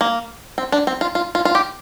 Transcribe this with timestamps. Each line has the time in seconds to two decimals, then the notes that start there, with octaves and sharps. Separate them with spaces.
0.01 A#3
0.58 C4
0.72 D4
0.87 C4
1.01 F4
1.15 F4
1.35 F4
1.45 F4
1.55 G4